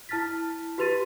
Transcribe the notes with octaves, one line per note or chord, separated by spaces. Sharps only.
E4 A5 F6 A6 B6
F#4 G4 B4 C6 A6 D#7